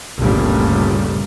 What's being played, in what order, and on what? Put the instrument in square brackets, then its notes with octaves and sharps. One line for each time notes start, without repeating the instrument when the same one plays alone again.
[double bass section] G1 D2 A#2 C#3 G3